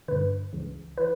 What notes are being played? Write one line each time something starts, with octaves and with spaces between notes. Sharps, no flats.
G2 D3 B4
C#2 C#3 E3
E3 B4